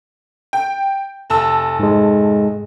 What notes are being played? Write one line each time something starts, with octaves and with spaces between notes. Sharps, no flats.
G5
F1 A5 E6
G#2 G#3